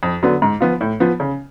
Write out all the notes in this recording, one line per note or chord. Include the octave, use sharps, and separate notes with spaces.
F2
D3 F#3 B3
G#2
F3 B3 F4
A2
F3 B3
C#3